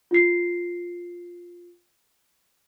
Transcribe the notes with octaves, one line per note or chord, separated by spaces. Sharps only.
F4 C7